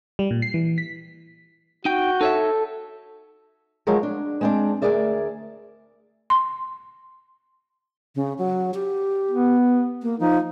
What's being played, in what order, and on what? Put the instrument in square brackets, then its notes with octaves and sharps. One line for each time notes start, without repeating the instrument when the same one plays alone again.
[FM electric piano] G3
A#2
C7
E3
B6
[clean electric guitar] D#4 G5 [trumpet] F#4 [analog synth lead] G6
[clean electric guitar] D#4 C#5 E5 [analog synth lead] A4
[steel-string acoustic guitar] F3 F#3 G#3 F#4 A#4 C#5
D4
G#3 C4 D4
D2 D3 G#4 A#4 D5 E5
[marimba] C6
[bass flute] C#3
F#3
G4
[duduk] B3
[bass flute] A#3
[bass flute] F3 [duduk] D#4